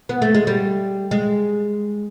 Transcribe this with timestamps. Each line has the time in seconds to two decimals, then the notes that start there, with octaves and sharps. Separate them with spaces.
0.09 B3
0.22 A3
0.35 G#3
0.47 G3
1.11 G#3